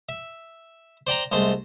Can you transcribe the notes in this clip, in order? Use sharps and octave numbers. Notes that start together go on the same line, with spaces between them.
E5
C5 D5 G5 A#5
C2 G#3 A3 C5